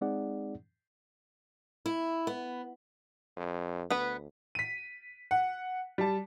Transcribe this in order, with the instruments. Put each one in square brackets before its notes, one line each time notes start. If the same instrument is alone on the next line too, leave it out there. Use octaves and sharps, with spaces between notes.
[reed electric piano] G#3 C4 D#4 G#4 D5 F#5
[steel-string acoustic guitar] E4
B3
[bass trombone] F2
[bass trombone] D2 [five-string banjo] B3 B4
[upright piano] B6 D#7
F#5
G3 A5